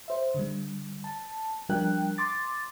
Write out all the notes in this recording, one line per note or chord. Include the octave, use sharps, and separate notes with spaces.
C5 E5
D3 G3
A5
F3 G3 D4 A#4 G5 F#6
C6 D6 A6